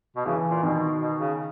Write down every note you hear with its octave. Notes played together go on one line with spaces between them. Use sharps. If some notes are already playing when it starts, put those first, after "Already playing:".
B2
C#3 E3
A#2
B2 D#3
B2
C#3